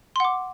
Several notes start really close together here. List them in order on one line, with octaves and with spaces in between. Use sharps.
C6 F#5 D6